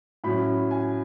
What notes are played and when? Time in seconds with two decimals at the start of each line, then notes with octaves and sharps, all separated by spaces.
0.24 A2 F#3 C#4 B5
0.71 G#5